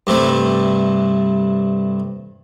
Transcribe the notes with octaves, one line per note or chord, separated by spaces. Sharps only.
G2 C3 A3